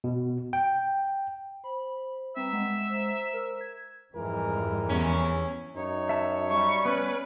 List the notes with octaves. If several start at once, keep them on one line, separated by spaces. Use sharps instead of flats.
B2
G5
C5 B5
G3 C4 B4 E5 A#5
G#3 F#5
C5 A#5
A#4
G#6
F2 G#2 E3 G3 G#3 A#4
E2 C#4
F#2 D#4 C#5
E5 A5
G3 C#6
B3 C#4 B4